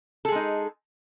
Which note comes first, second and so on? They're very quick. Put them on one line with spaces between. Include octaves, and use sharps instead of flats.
A4 G#4 G#3 D#4